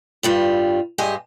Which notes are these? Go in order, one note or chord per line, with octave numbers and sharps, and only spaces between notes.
G2 G3 F4
G2 G#3 G4 D#5 G#5